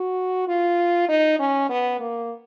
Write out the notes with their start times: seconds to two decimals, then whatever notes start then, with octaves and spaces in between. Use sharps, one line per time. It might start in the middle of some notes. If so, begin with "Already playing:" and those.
Already playing: F#4
0.48 F4
1.08 D#4
1.39 C#4
1.69 B3
2.00 A#3